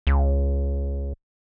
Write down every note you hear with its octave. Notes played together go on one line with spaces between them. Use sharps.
C#2